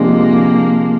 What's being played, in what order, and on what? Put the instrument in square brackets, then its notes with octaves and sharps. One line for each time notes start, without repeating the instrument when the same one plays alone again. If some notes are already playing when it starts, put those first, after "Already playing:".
Already playing: [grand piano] C3 F3 G#3 D4 G4 [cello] A#3